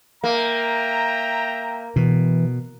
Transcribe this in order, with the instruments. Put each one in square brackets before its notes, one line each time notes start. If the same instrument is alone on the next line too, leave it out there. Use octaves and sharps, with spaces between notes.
[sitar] A#3 [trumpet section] E5 G5 A#5
[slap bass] B2 [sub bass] E3